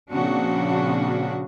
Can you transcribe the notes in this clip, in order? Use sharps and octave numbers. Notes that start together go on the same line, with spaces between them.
A#2 C#3 F3 C4 D4 F#4